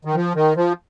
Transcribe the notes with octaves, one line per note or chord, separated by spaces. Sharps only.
D#3
F3
D#3
F3